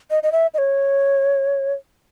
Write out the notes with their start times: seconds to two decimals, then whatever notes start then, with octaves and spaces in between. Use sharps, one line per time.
0.11 D#5
0.23 D#5
0.32 E5
0.54 D#5
0.58 C#5